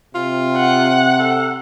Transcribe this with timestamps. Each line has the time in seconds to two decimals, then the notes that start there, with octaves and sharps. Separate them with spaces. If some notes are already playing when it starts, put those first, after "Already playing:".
0.15 C3 F4
0.57 F#5
1.20 A4